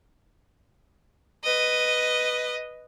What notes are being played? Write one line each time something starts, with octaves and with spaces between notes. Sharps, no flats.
B4 D#5